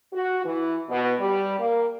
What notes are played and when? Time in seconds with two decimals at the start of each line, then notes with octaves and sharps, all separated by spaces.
0.13 F#4
0.45 E3
0.90 B2
1.20 G3
1.59 A#3